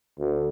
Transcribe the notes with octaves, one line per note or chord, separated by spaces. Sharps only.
D2